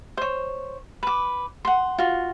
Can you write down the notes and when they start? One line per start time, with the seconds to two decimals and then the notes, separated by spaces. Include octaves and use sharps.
0.17 C5 C#5
1.03 B4 D6
1.65 F#5 C6
1.98 F4 F#4